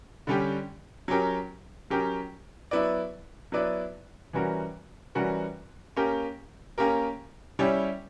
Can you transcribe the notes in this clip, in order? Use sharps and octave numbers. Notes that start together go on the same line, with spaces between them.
D3 G3 C#4 G4
F#3 C#4 G4 A#4
F#3 C#4 G4 A#4
F#3 B3 E4 B4 D5
F#3 B3 E4 B4 D5
E3 G3 C#4 F#4 A#4
E3 G3 C#4 F#4 A#4
A#3 C#4 G4 A#4
A#3 C#4 G4 A#4
G3 C#4 E4 G4 C#5